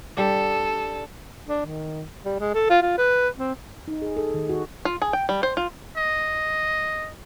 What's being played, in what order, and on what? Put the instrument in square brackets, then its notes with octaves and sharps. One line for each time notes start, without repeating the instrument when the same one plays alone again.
[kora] G3 D4 [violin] A4
[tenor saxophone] D4
D#3
G3
G#3
A4
F4
F4
B4
C4
[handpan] D#4
G#4
A4
D#3
F#4
[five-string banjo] F4
G#4
G5
G3
C5
F4
[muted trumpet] D#5